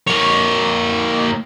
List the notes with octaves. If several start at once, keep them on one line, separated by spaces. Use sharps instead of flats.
A#3 C#5